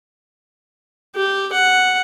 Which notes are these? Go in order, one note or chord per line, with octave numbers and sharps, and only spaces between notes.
G4
F#5